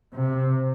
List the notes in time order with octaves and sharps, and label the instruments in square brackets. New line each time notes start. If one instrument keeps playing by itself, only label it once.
[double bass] C3